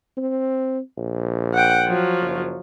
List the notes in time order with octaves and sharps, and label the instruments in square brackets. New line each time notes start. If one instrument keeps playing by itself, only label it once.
[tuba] C4
A#1
[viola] F#5 G5
F3 F#3
[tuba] F#1